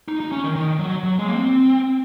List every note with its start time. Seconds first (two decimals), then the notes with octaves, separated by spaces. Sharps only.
0.08 D#4
0.20 D#4
0.32 C#4
0.44 D#3
0.56 D#3
0.79 F#3
1.03 F#3
1.19 G#3
1.29 A#3
1.35 C4